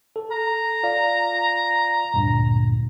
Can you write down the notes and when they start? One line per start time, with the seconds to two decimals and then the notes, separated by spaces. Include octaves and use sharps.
0.16 A4
0.31 A#5
0.83 F4 D5 F5
2.14 D2 G2 A#2